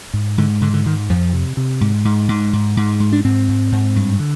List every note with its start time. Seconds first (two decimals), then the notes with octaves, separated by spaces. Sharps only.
0.13 G#2
0.38 G#2 D3
0.61 G#2 D3
0.74 D3
0.86 G#2 D#3
1.09 F2 F3
1.33 C3
1.57 C3
1.81 G#2
2.05 G#2
2.29 G#2
2.53 G#2
2.77 G#2
3.00 G#2
3.12 D4
3.24 G#2 C4
3.48 G#2
3.72 G#2
3.96 G2
4.19 D3